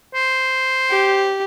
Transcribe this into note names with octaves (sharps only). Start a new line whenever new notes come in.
C5
G4